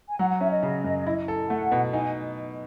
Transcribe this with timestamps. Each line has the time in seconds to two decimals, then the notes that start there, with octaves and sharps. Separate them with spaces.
0.09 G#5
0.18 F#3 F#5
0.30 F#5
0.40 C#4 E5
0.51 D#5
0.63 C#3
0.84 F#2
1.06 E4
1.28 A4
1.49 A3 F#5
1.72 B2
1.93 D#4 G#5